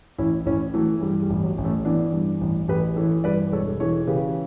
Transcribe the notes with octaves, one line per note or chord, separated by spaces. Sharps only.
A1 C#4 E4
A1 C#4 E4
E3 F#3 A3
G2 G3
G3
A1
F#3
A1
A3 C#4
E3 B3 D4
G2
A1
A1 G4 B4
E3 A4 C#5
G2 B4 D5
E1 A4 C#5
E3 A4 C#5
C#3 G4 B4